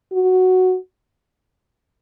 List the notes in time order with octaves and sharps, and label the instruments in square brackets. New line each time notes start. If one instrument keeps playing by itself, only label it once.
[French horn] F#4